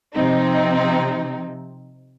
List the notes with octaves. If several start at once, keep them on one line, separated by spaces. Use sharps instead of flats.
C3 F3 C4 D#4